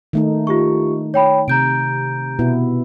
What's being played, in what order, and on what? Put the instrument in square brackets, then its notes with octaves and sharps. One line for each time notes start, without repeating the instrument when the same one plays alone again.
[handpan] D#3 A3 D#4
[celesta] F4 G4 C#6
C#5 G5 B5
[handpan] C3 [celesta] A#5 G6 D7
[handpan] B2 B3 E4